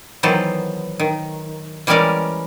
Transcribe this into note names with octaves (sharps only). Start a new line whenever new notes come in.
D#3 E3 F#3 B3 A4 C5
D#3
E3 G3 G#3 C#4 A#4 D5